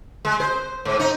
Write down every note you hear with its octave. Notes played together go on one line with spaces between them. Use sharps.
G#3
C5
G#2
D#4